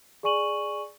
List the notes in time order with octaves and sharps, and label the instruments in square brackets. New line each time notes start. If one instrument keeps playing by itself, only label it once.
[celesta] G#4 D5 G#5 C#6 D#7 F#7